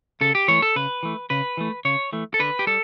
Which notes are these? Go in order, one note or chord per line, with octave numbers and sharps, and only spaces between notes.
C#3 A4
G4
E3 A3 C#5
A4
C#3 B4
E3 A3
C#3 B4
E3 A3
C#3 C#5
E3 A3
A4
D3 B4
G4
G3 A4